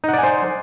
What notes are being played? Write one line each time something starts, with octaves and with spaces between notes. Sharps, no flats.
D#4 C5 D5 F#5 G#5